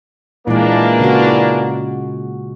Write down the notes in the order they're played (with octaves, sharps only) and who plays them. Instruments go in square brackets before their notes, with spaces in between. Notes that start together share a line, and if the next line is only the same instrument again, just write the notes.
[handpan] A#2 G#3 [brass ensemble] E3 A#3 D4
[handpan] C#3 F#4